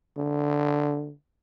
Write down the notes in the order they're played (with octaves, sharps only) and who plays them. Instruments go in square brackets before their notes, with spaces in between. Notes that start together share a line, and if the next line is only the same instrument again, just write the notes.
[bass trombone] D3